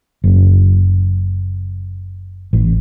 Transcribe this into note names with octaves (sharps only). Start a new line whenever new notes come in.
F#1
A1